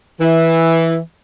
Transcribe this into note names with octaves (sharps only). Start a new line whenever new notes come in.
E3